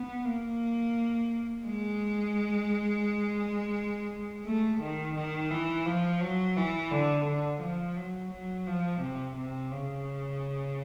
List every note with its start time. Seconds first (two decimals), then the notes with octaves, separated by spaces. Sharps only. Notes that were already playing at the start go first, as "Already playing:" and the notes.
Already playing: B3
0.26 A#3
1.66 G#3
4.46 A3
4.82 D#3
5.16 D#3
5.51 E3
5.86 F3
6.21 F#3
6.57 E3
6.91 D3
7.26 D3
7.61 F3
7.97 F#3
8.31 F#3
8.67 F3
9.01 C3
9.38 C3
9.72 C#3